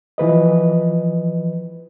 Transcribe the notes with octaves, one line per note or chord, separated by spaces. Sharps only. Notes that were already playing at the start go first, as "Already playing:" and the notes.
E3 F3 B4 D#5